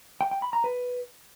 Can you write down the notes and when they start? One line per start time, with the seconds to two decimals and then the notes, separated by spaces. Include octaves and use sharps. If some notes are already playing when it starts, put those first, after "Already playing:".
0.21 G5
0.31 G5
0.42 B5
0.53 A#5
0.64 B4